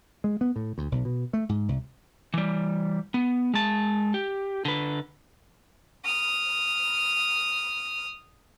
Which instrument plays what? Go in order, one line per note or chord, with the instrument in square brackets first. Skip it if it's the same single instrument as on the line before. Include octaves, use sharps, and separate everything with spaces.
[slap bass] G#3
B3
A2
D2
B1
B2
A3
G#2
C2
[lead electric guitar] E3 G3
B3
G#3 A5
G4
D3 B4
[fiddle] D#6 F6